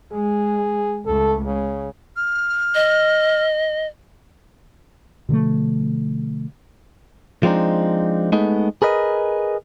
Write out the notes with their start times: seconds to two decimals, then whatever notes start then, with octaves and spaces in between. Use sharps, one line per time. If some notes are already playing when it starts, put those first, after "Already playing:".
0.12 G#3 G#4
1.06 C#2 A3 A4
1.45 C#3 G#3
2.17 F6
2.75 D#5
5.29 B2 D3 F3 A3
7.43 F3 G#3 C4 D4 D#4
8.32 G#3 A3 B3 D#4
8.82 G#4 A#4 B4 D#5